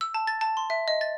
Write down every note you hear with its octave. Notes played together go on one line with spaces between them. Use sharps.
E6
A5
A6
A5
C6
E5
D#5
A6